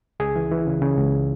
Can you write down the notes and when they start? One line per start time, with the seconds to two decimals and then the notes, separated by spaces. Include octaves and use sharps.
0.20 C#2 G#4
0.36 E3
0.51 E3
0.67 C#3
0.82 C#3
0.98 C#2